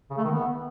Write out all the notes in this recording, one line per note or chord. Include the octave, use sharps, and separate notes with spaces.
C#3
A3
D#3
B3